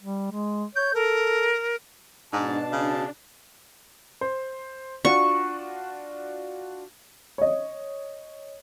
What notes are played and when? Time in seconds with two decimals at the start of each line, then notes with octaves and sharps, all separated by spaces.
0.01 G3
0.32 G#3
0.75 C#5 G6
0.94 A4 A#4
2.33 G#2 B2 D4 A5
2.72 C#3
4.21 C5
5.05 D4 F4 F#4 C#6
7.38 C#5 D#5